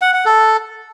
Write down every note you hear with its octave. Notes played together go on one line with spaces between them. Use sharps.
F#5
F#5
A4